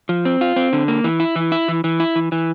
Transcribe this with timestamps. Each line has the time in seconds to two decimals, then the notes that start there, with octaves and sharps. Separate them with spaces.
0.09 F3
0.25 C4
0.41 F4
0.56 C4
0.73 D3
0.88 A#3
1.04 E3
1.20 E4
1.36 E3
1.52 E4
1.68 E3
1.84 E3
2.00 E4
2.16 E3
2.32 E3